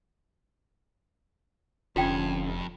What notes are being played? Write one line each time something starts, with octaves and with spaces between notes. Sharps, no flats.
F1 F2 D3 C#4 F4 G5